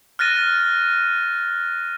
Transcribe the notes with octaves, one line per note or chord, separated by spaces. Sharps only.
F6 F#6 A6 A#6 D#7